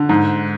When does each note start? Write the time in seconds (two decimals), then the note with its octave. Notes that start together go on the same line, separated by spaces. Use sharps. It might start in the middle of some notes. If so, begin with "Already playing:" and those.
Already playing: D3
0.09 G#2